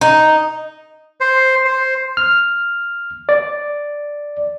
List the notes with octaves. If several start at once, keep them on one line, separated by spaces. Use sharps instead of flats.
D#4
C5
C5
F6
D5